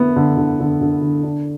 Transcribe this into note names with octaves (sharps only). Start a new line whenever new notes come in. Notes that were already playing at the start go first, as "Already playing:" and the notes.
Already playing: D3 B3 E4
D3
D3
D3
D3
D3
D4